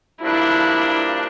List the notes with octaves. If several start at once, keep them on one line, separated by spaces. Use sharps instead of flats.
G2 F3 A#3 D4 E4